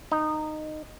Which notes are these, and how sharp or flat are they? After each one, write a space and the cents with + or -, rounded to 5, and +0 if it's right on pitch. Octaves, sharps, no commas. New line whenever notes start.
D#4 -15